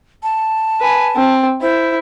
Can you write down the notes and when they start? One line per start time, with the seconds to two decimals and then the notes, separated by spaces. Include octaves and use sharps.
0.23 A5
0.80 B4 G#5
1.16 C4
1.62 E4 C5